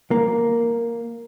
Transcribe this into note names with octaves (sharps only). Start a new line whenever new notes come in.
A#3